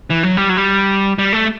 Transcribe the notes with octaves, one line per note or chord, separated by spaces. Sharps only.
E3
F#3
G3
F#3
G3
G3
A3